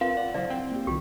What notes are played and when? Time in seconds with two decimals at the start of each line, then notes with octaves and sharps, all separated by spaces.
0.01 C4 F4 A#4 B4 F5
0.17 D5 F#5
0.34 C#2 F#3 E4 C5 D5 F5
0.50 C4 G5
0.72 A#3 G4
0.87 C2 D#3 F4 G4